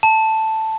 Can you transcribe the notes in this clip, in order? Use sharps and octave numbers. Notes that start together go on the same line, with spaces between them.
A5